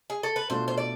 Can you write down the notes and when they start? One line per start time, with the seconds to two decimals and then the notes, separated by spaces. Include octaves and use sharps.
0.10 G#4
0.23 A4
0.36 B4
0.50 B2 A3 D4 F4 C5
0.68 C5
0.78 D5